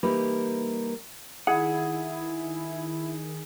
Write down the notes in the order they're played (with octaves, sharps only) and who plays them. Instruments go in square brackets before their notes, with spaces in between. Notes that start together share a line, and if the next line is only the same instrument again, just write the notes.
[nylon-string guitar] E3 G3 A#3 D#4 G4 B4
[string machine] D#3 [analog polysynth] E4 [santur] G#4 [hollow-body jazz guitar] F#5